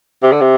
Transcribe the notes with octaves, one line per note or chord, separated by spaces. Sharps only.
C3
D3
C3